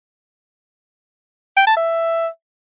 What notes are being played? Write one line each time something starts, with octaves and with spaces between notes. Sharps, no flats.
G5
A5
E5